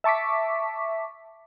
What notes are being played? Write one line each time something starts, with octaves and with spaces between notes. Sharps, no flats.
E5 A5 C#6 D6 B6